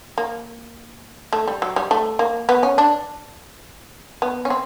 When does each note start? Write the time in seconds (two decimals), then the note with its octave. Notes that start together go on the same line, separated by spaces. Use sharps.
0.18 A#3
1.33 A3
1.47 G3
1.62 F#3
1.76 G3
1.91 A3
2.19 A#3
2.49 B3
2.63 C#4
2.78 D4
4.22 B3
4.45 C#4
4.50 C4